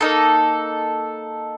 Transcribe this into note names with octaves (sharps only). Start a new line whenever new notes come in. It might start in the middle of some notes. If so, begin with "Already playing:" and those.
A#3 D#4 A4